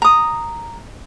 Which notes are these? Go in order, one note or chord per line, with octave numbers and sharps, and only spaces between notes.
A#5 D#6